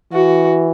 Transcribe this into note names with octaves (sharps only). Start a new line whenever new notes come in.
E3 F#4